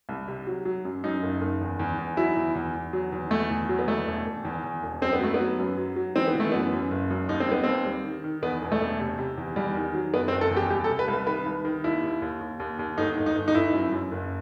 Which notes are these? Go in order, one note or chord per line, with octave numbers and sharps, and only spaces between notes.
C2
C3
F#3
F#3
F#2
F#2 D#4
F#1
F#1
E2
E2
E2
F#3 E4
E2
E2
E2
F#3
E2
E2 A3
E2
F#3
B3
E2 A3
E1
E1
E2
E2
E1
F#2 C4
B3
F#3 A3
B3
F#3
F#2
F#3
F#3
E3 C4
B3
E3 A3
F#2 B3
F#2
F#1
F#2
D#2 D#4
C4
G3 B3
D#2 C4
G3
D#3
D#3
E2 B3
E1
A3
E1
C3
C3
E2
E2 G3
D#3
F#3
F#1 B3
C4
F#1
A4
E2
G4
C2 G4
A4
C3
B4
C2
B4
D#3 B4
C2
D#3
D#2 E4
D#2
D#2
D#2
D#2
D#2
G1 D#4
G1
D#4
G1
D#4
G1 E4
F#2
F#2
F#1